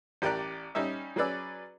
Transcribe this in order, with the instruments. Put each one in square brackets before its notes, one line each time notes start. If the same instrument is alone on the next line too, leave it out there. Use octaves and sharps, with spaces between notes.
[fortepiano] A1 G4 A#4 D5 F#6
G3 C#4 D#4 E5
F#3 C#4 G#4 B4 D5 E6